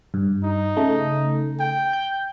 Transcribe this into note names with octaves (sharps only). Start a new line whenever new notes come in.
G2
D#4
C#3 A3
G5
G6